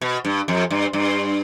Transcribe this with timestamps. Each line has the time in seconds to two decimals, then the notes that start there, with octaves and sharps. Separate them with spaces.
0.01 B2
0.25 G2
0.48 F2
0.70 G2
0.93 G2